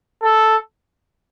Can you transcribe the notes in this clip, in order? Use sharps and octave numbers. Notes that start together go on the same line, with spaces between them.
A4